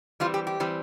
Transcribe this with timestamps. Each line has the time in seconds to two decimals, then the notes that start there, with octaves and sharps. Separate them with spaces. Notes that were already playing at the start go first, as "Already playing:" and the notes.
0.20 E3 G3 C4 F4
0.34 G4
0.47 G4
0.60 E3 G3 C4